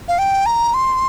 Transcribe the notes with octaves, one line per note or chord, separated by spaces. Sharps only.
F5
G5
A#5
C6